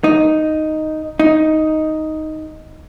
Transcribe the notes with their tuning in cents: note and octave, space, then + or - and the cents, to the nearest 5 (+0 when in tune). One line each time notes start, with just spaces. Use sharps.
D#4 +0
D#4 +5